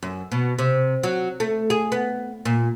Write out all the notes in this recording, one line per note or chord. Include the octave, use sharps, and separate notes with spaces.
F#2
B2
C3
F#3
A3
G#4
B3
A#2